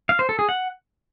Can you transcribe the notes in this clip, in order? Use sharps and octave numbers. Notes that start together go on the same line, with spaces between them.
F5
C5
A4
G#4
F#5